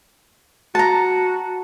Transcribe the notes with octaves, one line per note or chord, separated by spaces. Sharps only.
F#4 A5 A#5